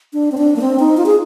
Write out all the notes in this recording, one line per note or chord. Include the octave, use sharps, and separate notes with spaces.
D4
C4
D4
A#3
C4
D#4
F4
G#4